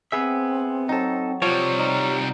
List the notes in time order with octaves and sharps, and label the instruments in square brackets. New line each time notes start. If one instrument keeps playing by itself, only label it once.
[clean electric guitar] B3 G#4 E5 [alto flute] C4
[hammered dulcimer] F#3 [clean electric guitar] D#4 A4
[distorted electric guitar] C3 G3 [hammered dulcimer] F3 [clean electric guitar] C#5
[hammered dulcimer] D#4 [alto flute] D5